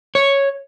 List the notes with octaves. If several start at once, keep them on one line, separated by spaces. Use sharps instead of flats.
C#5